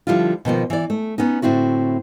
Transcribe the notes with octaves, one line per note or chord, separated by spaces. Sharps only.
D3 F3 G3 E4 F4
B2 D#3 F3 A#3
E3 D5
A3
B3 C#4 D#4
A2 D3 C4 E4 F#4